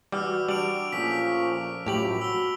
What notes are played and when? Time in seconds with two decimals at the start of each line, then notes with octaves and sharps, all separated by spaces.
0.12 E3 G3 F#4 G4 D6 E6 F6
0.48 G3 D4 D7 F7 F#7
0.92 A#2 F3 A3 C#4 G#4 B6
1.86 F#2 A2 F3 G3 G4 F7 F#7
2.21 F#4 E6 G7